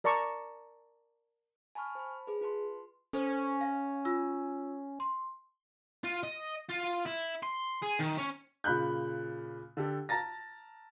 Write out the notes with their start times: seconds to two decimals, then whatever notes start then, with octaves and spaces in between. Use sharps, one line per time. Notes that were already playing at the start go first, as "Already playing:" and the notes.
0.04 A#4 D5 A5 A#5 C#6
1.75 G#5 A5 B5 C#6 F6
1.95 C5 A5 B5
2.27 G#4 B4
2.41 F4 B4 A5 C6
3.13 C#4 A4 C5
3.61 F5
4.05 F4 E6
5.00 C6
6.04 F4
6.23 D#5
6.70 F4
7.06 E4
7.43 C6
7.83 G#4
8.00 D#3
8.18 C#4
8.64 A#2 C#3 B5 F#6 G6
9.77 D3 G4 A4
10.09 A5 A#5 A6 A#6